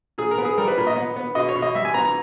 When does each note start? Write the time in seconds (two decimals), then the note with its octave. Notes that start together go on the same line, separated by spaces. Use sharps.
0.18 A#2 G#4
0.31 A#4
0.38 B3
0.45 G#4
0.58 G3 A#4
0.68 B4
0.78 A#2
0.87 D#5
0.96 B3
1.16 B3
1.35 B2 D#5
1.49 C#5
1.55 B2
1.62 D#5
1.75 G3 E5
1.85 G#5
1.94 B3 A#5
2.05 A#5